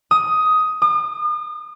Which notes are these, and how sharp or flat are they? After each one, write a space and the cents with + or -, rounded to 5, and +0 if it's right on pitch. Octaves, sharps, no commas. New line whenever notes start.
D#6 +10
D#6 -40